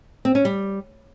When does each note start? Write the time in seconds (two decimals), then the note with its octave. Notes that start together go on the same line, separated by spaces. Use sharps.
0.25 C4
0.35 C#4
0.45 G3